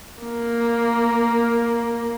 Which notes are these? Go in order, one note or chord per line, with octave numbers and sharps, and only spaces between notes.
A#3